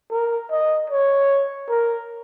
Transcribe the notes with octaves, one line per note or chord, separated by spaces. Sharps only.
A#4
D#5
C#5
A#4